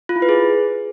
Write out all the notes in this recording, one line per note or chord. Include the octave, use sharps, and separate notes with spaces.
F4
E4
B4
G#4